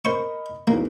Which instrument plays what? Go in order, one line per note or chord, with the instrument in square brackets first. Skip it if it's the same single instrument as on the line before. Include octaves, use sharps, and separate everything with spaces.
[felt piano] A#4 D#5 B5 [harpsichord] C5 C#6
[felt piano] B1 E2 [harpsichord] A#3